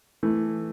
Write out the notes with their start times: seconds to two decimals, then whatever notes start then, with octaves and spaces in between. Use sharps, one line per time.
0.23 E3 A3